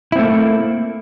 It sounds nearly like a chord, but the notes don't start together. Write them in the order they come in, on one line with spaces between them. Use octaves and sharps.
E4 C4 A3 A#3